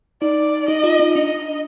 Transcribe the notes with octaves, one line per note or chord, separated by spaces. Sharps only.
D#4 D5
D#4 D#5
F4
D#4
D4 D#5